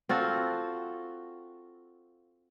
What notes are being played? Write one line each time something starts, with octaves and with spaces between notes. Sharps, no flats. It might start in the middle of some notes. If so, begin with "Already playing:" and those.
C4 F4 F#4 A4